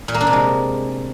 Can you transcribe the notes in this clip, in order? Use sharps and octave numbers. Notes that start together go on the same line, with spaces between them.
A#2
A#3
D4
C3
G#3